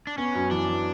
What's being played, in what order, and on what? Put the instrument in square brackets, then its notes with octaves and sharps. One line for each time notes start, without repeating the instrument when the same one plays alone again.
[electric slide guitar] D4
[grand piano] B3 [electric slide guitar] C#4
[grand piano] F#2
[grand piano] E3 [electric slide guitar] D4
[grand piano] E3